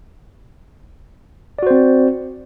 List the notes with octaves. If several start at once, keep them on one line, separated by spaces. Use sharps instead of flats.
C4 F#4 C5 D5